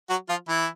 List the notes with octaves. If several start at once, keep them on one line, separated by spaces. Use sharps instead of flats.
F#3 F#4
F3 F4
E3 E4